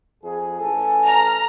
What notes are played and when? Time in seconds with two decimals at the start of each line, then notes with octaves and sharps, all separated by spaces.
0.23 F2 G#4
0.59 A1 A4 G#5
1.06 A#5 F6